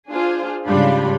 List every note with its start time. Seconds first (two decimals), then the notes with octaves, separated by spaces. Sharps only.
0.11 D4 F4 G#4 C5
0.66 G#2 C#3 G3 D4 F4 B5